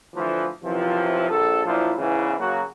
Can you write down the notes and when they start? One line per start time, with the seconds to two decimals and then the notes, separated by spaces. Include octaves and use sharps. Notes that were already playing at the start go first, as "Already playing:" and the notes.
0.15 D2 E3 F3
0.64 F#2 C3 E3 F3
1.29 A#1 A4
1.66 F#2 A#2 F3 D4 E4 F4
1.98 E2 G#2 C#3 E3
2.40 C#3 F#3 A#3 F#4